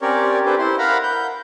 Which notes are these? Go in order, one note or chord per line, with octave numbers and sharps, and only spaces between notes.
C4 C#4 G4 A#4 C#5 D5
D4 G4 A4 B4 C5
E4 C5 C6
A#4 F5 F#5 A#5 B5 F6
G6